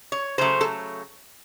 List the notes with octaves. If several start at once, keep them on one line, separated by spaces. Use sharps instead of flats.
C#5
C#3 F#3 A3 C5
A4